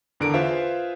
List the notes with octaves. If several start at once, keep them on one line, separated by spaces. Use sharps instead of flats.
E2 D3 A#4 D7
F4 G#4 B4 C5 E5 F5